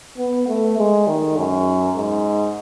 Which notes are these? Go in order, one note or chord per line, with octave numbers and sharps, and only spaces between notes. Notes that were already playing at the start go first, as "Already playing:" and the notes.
B3
A3
G#3
D#3
F#2
G#2